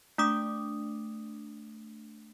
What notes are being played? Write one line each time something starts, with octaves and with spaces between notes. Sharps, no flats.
A3 D4 D6 D#6